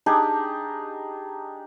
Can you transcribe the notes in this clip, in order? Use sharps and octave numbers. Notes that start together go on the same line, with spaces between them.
D4 D#4 G4 G#4